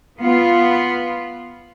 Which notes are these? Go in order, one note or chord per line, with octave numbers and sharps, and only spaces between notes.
B3 F4